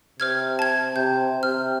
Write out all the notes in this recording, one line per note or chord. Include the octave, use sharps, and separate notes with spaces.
C3 C5 F6 G#6
A5 G#6
C3 G6
C3 F6